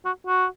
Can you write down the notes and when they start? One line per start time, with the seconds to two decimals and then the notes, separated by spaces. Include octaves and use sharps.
0.05 F#4
0.27 F#4